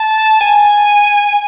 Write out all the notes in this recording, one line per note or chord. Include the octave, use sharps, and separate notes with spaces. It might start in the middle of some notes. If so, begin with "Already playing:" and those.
Already playing: A5
G#5